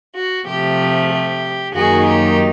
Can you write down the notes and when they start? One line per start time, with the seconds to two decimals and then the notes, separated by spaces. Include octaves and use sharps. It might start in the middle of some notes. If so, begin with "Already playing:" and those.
0.15 F#4
0.46 C3 F3 A3 G4
1.10 G4
1.73 F#2 D#3 F#3 A#3 D#4 F#4 G#4
2.06 G4